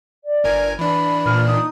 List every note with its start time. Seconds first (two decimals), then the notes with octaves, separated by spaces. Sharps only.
0.24 D5
0.44 G1 A#4 G#5
0.79 E3 D4 B5
1.26 A#2 F6
1.47 D#4 D#6